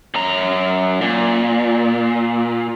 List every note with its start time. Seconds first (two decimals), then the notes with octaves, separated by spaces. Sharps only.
0.14 F#2 A#5
1.01 A#2